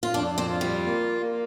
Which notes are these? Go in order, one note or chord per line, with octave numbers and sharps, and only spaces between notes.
F4
F2 D4
C4
F4
G3
A#3
A#3